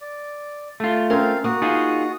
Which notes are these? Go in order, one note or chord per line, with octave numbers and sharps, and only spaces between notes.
D5
A3 F4
C4 C#4 A#4 F5
A#3 F#4 D#6
D#4 F4 G#4